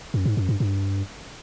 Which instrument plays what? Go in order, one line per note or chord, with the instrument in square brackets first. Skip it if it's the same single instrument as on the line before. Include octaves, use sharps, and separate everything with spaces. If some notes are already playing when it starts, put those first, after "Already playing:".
[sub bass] F#2
G#2
F#2
G2
G2